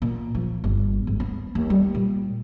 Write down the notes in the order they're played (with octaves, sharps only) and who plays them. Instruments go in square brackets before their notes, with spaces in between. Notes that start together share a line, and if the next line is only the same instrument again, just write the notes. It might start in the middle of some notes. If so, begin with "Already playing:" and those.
[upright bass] A#2
F3
G1
G#1
B3
D#2
G3
A#2